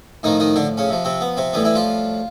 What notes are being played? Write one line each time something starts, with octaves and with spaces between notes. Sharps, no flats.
A2 D#3 F3 D#4
D#3 D#4
D3 D4
C#3 C#4
C3 F3
C3 C4
B3
C3 C4
A2 E3 G3 B3
E3 E4
F3 F4